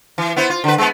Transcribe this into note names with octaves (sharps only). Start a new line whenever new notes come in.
E3
B3 E4 C5
F4
D3 B4
G#3 B3